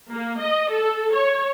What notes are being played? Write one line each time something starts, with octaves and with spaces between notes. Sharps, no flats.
A#3
D#5
A4
C#5